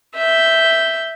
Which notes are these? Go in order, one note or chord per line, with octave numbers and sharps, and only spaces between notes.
E5 G6